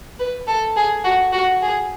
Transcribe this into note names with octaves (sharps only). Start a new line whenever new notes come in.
B4
A4
G#4
F#4
F#4
G#4